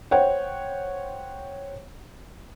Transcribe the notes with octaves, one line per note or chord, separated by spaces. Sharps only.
C5 C#5 F#5 G5